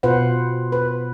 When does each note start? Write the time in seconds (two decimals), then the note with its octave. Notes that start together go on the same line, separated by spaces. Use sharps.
0.03 B2 F4 B4 C5 F#5
0.72 B4